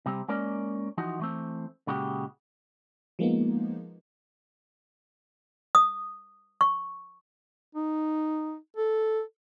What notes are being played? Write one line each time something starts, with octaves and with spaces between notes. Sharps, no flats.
C3 G3 C4
G#3 A#3 C#4 A#4 D5
E3 F3 D#4 F#4
E3 A3 C4
A#2 C#3 G#3 F#4 G4
F3 G#3 A#3 B3 D#4
D#6
C#6
D#4
A4